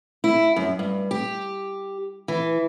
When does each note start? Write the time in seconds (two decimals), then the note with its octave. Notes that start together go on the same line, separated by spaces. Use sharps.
0.24 E4
0.56 F#2
0.79 G2
1.11 G4
2.28 E3